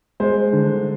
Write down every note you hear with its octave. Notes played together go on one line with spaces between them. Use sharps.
G#3 C5
D3